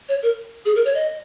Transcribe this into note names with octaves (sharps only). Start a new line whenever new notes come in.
C#5
A#4
G#4
A#4
C#5
D#5